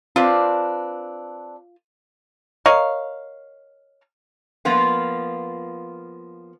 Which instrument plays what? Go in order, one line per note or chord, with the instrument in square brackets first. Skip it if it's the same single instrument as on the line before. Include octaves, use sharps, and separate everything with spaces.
[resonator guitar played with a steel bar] C4 D4 B4 [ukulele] F4
[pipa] A#4 C#5 D#5 F5
[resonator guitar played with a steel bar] F3 A#3 B3 F4